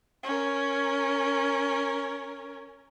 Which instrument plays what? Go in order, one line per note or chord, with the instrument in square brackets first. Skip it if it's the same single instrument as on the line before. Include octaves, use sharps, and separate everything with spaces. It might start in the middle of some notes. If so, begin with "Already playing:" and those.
[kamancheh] C#4 A#4